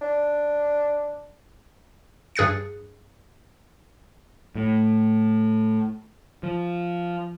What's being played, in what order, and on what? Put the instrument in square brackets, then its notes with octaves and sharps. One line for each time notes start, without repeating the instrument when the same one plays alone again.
[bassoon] D4
[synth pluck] G2 G#4 F#6 A6 C#7
[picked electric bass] A2
F3